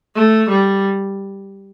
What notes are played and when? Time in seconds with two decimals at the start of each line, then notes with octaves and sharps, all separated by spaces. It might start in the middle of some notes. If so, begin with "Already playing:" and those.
0.15 A3
0.50 G3